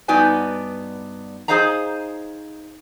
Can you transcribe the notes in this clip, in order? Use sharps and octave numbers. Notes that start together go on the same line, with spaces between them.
G2 B3 D#4 F#4 D5 G#5
D#4 G#4 C5 D#5 F5 A#5